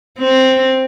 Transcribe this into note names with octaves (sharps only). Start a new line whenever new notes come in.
C4